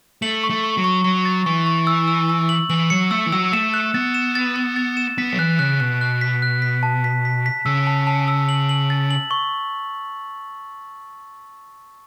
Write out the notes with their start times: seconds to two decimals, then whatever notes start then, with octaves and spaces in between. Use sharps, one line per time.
0.22 A3 F#7
0.44 C#6
0.50 A3
0.64 C#6
0.77 F#3
0.84 C#6
1.04 F#3 C#6
1.25 A6
1.46 E3 C#6
1.66 C#6
1.87 E6
2.08 E6
2.29 E6
2.49 F#7
2.70 E3 F#7
2.90 F#3 C#7
3.11 A3 E6
3.26 E3
3.32 F#3 E6
3.52 A3 E7
3.74 F#6
3.94 B3 A6
4.14 E7
4.35 A6
4.56 A6
4.76 A6
4.97 E7
5.18 B3 B6
5.33 F#3
5.38 E3 F#6
5.59 C#3 F#6
5.80 B2 F#6
6.01 F#6
6.21 B6
6.42 F#6
6.62 B6
6.83 A5
7.04 B6
7.25 B6
7.46 B6
7.66 C#3 E6
7.87 A5
8.07 A5
8.28 E6
8.49 F#7
8.69 F#7
8.90 A6
9.11 F#7
9.31 C#6